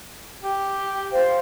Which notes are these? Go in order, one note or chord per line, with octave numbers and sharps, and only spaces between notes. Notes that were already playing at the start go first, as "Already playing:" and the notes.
G4
C5 F5